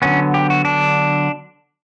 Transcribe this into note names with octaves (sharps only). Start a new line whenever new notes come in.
D3 F#3 B3 C#4
G4
F#4
D4